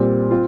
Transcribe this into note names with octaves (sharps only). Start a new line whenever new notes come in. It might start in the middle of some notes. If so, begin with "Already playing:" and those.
Already playing: A#2 G3 C4
C4 F4